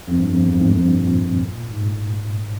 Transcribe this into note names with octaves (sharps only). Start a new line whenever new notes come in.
F2
G2
F2
E2
F2
G#2
G2
F2
G2
A#2
G#2